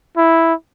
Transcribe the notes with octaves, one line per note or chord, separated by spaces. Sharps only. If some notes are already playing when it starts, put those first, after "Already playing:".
E4